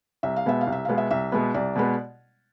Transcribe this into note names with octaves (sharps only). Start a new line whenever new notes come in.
C2 E5
F5
B2 G#3 B3 E5
F5
C2
E5
B2 G#3 B3 F5
E5
C2 E5
B2 G#3 B3
C2 D5
B2 G#3 B3